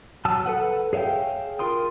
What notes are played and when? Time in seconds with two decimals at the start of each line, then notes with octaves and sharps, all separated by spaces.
0.25 F#3 A5 D#6 E6
0.46 A4 B4 F#5
0.93 G#4 C#5 E5 F5 G5
1.59 F4 A#4 C6 D#6